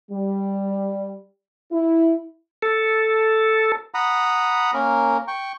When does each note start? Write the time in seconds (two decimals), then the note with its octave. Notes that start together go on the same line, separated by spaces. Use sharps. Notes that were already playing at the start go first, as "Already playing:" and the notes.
0.11 G3
1.72 E4
2.62 A4
3.94 F#5 A#5 B5 D#6
4.74 A#3 C#4 A#4
5.28 G5 C#6